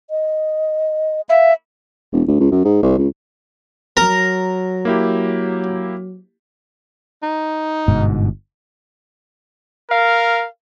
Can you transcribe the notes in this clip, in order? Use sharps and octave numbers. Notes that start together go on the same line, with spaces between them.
D#5
E5 F5
E1
D2
C#2
F#2
G#2
C2
C#2
F#3 A#4 A#5
A#3 E4 G4
D#4
G1 G#2 B2
A#4 F5